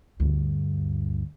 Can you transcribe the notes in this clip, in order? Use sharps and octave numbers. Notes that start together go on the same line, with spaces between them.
D2 G2